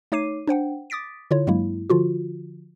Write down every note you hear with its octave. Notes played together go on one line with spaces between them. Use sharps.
A3 D#4 C#5 D6 C7 D#7
D4 C5 F#5 G5
D6 D#6 A6 B6 D7
D3 E4 F4 C#5
G2 F#3 G#3 A#3 E4
D3 F3 F4 F#4